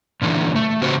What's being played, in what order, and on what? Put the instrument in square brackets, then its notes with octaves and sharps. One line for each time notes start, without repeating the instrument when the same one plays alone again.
[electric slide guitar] A#2 D3 E3
A3
C#3 C4 F#4 G4 C5